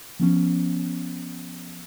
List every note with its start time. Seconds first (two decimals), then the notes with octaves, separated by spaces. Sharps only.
0.19 F3 B3 C#4